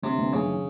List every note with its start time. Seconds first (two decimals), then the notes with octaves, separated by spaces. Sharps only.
0.02 G1 C3
0.18 G1
0.33 F#2 C#3
0.48 D#3